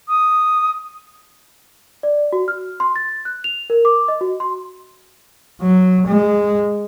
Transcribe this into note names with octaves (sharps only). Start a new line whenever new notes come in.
D#6
D5
F#4
F6
C6
A6
F#6
F7
A#4
D6
D#5
F#4
C6
F#3
G#3